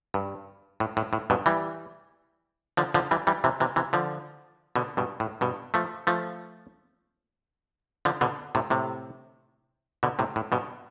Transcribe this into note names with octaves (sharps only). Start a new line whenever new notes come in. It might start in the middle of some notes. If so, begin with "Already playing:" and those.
G2
A2
A2
A2
G2 B2
E3 G3
D3 F3
D3 F3
E3 G3
E3 G3
C3 E3
C3 E3
C3 E3
D3 F3
B2 D3
G2 B2
A2
G2 B2
F3 A3
F3 A3
D3 F3
B2 D3
A2 C3
A2 C3
B2 D3
A2 C3
A2
G2 B2